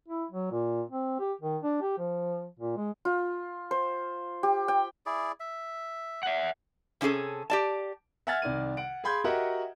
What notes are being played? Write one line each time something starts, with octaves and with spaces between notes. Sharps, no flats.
E4
F#3
A#2
C4
G4
D#3
D4
G4
F3
A#2
G#3
F4
C5
G4
G5
E4 G#4 D5
E5
E5 F#5
C3 C#4 E4 G#4 A4
G4 D5 A5
E5 F#5 G#5 F6 G#6 A6
C2 D#3 D5 D#7
F#5 D7
G#4 F5 B5 C6 G6 G#6
F#4 G4 A#4 D#5 E5 F#5